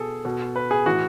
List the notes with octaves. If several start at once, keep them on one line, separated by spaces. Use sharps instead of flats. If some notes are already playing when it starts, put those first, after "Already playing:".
Already playing: B2 G#4 A4
B2
B4
G#4
A2 E3 F#4